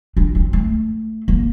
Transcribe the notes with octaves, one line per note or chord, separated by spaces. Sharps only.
D4
C4
A3
A#3